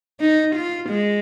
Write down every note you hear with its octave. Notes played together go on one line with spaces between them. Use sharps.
D#4
F4
G#3